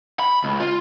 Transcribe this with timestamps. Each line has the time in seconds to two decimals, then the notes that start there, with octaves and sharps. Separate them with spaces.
0.20 B5
0.44 C#2
0.60 F4